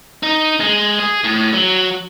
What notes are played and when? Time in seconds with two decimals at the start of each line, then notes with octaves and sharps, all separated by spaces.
0.23 D#4
0.60 G#3
0.99 G#4
1.24 A2
1.54 F#3